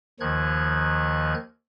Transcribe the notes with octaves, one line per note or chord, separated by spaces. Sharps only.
D#2 D#3 F3 F#6 G#6